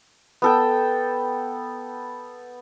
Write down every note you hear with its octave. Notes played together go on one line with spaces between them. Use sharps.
B3 A4 G5